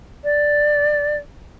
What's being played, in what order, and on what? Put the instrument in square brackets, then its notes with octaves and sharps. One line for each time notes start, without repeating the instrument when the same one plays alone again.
[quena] D5